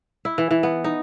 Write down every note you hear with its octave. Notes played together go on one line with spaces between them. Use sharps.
E4
E3
E3
B3
D#4